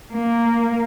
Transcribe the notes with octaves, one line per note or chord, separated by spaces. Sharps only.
A#3